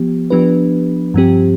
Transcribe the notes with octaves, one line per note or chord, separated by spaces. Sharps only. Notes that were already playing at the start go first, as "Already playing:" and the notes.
Already playing: F3 B3 G4
F3 B3 D4 G4 B4
G2 F3 C4 G4